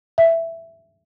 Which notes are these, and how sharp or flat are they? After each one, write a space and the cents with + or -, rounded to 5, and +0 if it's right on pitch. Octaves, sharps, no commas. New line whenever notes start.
E5 +5